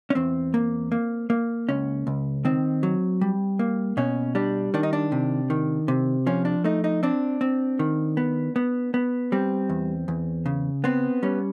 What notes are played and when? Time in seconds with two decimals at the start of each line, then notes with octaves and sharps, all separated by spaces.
0.10 C#4
0.15 E2 C4
0.54 A#3
0.92 A#3
1.30 A#3
1.69 C#2 C#4
2.07 C#2
2.45 D#3 C4
2.83 F#3
3.21 G3
3.59 A#3
3.97 B2 C#4
4.35 G3 D4
4.74 D#3 D4
4.83 D#4
4.93 D4
5.12 C3
5.50 D#3
5.88 C3
6.26 F3 C#4
6.45 D4
6.64 A3 D#4
6.84 D#4
7.03 C4 D4
7.41 C4
7.79 D#3
8.17 B3
8.56 B3
8.94 B3
9.32 G3 C4
9.69 E2
10.08 E2
10.46 C#3
10.84 B3 C4
11.23 G3 C#4